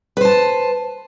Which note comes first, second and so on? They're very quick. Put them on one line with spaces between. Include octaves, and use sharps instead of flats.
B4 C5 A5